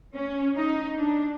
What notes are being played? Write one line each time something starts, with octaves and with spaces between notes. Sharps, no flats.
C#4
D#4
D4